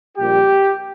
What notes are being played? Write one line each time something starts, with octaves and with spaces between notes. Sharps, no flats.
A#1 A#2 G3 G4